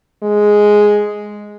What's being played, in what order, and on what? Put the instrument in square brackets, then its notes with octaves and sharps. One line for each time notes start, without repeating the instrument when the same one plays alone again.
[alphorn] G#3